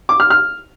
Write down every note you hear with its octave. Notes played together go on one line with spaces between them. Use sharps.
D6
F6
F6